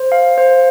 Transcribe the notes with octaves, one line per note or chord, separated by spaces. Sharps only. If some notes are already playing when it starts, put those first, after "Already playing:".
Already playing: C5
F5
C5